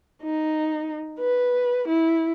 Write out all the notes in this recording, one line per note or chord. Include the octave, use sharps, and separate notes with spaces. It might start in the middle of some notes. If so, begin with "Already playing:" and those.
D#4
B4
E4